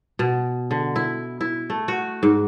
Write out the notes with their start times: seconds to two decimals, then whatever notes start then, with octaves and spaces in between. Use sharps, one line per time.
0.19 B2
0.71 D3
0.96 E4
1.41 E4
1.70 A3
1.88 F#4
2.23 G#2